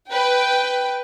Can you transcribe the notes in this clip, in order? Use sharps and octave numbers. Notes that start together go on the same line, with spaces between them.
B4 G5